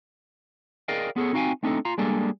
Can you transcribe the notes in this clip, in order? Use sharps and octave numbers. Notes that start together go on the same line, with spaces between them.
G#4 A#4 D5 D#5 F5 G5
B3 G#4 A4 C#5
C4 D#4 F#4 F5 G5 G#5
A3 C4 D4 D#4 G4 A4
F4 F5 A#5
G3 G#3 A#3 D4 G#4 A4